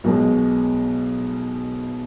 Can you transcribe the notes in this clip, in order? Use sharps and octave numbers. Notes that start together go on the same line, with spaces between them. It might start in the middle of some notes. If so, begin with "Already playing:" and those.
B1 B2 G#3